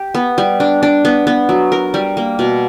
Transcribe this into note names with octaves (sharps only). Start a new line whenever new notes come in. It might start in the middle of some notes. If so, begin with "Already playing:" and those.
Already playing: G4
B3
G3
D4
D4
B3
B3
F#3
A#4
G3
A#3
B2